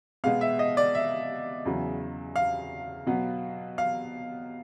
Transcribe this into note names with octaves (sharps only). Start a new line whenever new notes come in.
B2 G#3 B3 F5
E5
D#5
D5
E5
E2 C#3 F#3
F5
B2 F#3 B3
F5